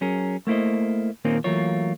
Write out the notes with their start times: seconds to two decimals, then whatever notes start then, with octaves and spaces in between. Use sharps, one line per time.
0.01 F#3 C#4 G#4 A#4
0.47 A3 A#3 E4 C5 D#5
1.25 D#2 A#2 D#3 A#3 C4 C#4
1.44 E3 F#3 A3 A#3 F4 C#5